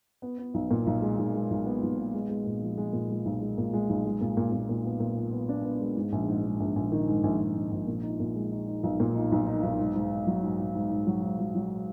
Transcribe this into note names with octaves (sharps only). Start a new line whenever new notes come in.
B3
B3
B1
A#2
B1
G#3
B1
G#3
B1
B3
B1
B3
G#3
G#3
A#2
F3
G#3
A#2
G#3
B1
G#3
A#2
G#3
B1
G#3
A#2
A#2
A#2
A#2
B3
A#2
B3
B3
D4
B3
G#3
G#2
A#1
G#2
G#2
A#1
A#1
D#3
G#2
A#1
A#1
G#2
A#1
A#2
D#4
A#2
G#3
D#4
D#4
B1
A#2
D#4
B1
D#4
B1
G#2
G#2
G#2
F#3
G#2
G#2
G#2
G#2
F#3
G#2
F#3
F#3